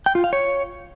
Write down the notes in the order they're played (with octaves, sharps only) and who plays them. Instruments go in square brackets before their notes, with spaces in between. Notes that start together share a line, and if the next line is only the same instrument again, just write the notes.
[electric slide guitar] G5
F4
F5
C#5